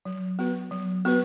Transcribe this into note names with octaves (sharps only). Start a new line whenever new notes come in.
F#3
B3 F#4 B4
F#3
B3 F#4 B4